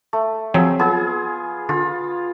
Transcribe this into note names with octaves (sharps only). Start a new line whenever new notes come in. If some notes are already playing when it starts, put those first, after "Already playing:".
A3
F3 F#3 C4 G#4 E5
B3 F4 G#4
D3 F4